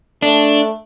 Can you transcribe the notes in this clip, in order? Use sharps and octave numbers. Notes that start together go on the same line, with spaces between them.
A3 D4